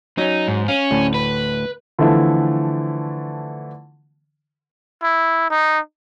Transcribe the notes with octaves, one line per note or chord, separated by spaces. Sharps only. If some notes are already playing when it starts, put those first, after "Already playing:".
F#3 C#4 D#4
G#2
C#4 F5
D2 A2
B4
D3 E3 F3 A3 B3 E4
E4
D#4